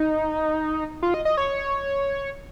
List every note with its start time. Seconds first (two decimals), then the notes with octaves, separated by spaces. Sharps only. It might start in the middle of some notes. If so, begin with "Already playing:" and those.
Already playing: D#4
1.03 F4
1.14 D#5
1.25 D#5
1.37 C#5